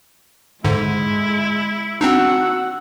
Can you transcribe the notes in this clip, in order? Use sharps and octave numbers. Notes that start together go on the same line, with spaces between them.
G#2 D3 G#3 E4
C4 D4 D#4 F#4 F#5 E6